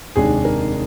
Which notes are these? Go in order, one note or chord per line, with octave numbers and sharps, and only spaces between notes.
F1 D#2 D#3 G#3 D4 G#4
A#4